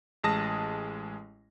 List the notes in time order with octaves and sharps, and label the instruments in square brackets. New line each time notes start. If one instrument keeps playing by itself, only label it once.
[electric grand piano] A1 G#3 A5 D#6 A#6